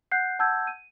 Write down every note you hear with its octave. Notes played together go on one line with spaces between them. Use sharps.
F#5 F#6 G6 C7
F#5 A5 E6 G6 G#6
D#7